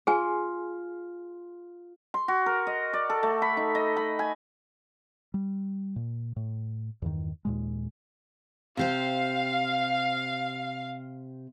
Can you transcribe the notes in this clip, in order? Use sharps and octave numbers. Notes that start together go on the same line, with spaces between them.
F4 G#4 G#5
C6
F#4
A#4
D#5
D5
A4
A3
B5
D#4
D#5
B5
G#5
G3
A#2
A2
E2 G2 D#3
D#2 A#2 G#3
C3 G4 C5 F5